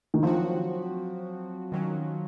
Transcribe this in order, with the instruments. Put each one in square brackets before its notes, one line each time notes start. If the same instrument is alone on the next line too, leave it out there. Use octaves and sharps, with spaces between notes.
[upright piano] D#3
[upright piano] F3 [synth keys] F#3 C4 F#4
[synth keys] D#3 F#3 C#4